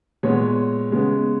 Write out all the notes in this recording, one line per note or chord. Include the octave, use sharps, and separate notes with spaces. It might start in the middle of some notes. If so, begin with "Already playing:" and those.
A#2 G#3 B3 C#5
C#3 G#3 B3